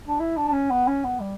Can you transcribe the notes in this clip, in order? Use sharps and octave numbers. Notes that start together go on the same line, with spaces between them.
D4
E4
D4
D4
C#4
B3
C#4
B3
G3